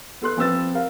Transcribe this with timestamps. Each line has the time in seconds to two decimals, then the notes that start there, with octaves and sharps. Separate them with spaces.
0.22 B3 A4 C6 F#6
0.37 F3 C4 B4 E6 A6
0.75 A#4 F5